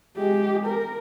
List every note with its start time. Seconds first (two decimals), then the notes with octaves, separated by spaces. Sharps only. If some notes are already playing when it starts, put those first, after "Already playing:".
0.17 G#3 G4
0.65 A#4